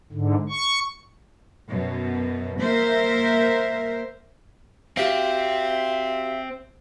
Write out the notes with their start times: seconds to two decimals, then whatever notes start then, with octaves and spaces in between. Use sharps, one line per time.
0.12 G#2 D3
0.49 C#6
1.69 F#2 B2
2.61 A#3 A#4 C5 E5
4.97 C4 F#4 G4 E5 F5